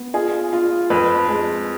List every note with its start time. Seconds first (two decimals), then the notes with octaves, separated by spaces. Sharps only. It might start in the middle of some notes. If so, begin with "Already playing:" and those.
Already playing: B3
0.14 F4 G#4
0.53 F4
0.90 F2 B4
1.29 G#3